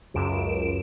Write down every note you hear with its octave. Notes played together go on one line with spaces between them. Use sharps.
C#2 F#2 D7 E7